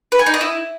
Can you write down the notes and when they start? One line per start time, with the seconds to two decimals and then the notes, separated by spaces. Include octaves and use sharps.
0.12 B4
0.19 G#5
0.26 D#4
0.34 D#5
0.41 E4